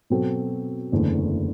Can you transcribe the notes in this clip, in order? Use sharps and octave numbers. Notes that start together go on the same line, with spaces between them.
B2 F#3 C4 F#4 A4
F#1 E2 D3 A3